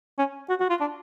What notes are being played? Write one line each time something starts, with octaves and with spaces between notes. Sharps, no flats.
C#4
F#4
F#4
F4
D4